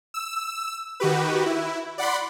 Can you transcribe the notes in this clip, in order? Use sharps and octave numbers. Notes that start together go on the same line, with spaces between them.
E6
D#3 F#4 G4 B4
E4
D5 F#5 B5 C6